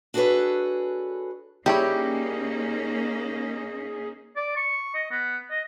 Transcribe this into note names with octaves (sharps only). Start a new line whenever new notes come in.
D4 F#4 G#4 A4 B4 C#5
G3 A#3 C#4 D#4 E4 G4 G#4 C#5
D5
C#6
D#5
B3
D#5